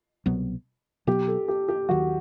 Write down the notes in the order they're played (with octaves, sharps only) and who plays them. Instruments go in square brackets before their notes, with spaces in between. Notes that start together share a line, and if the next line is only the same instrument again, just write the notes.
[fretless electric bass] C2 B2 F#3 B3
[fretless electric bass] B2 F#3 B3 [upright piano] G4
[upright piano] A4
G4
G4
[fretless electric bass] D#2 D#3 F#3 [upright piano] F#4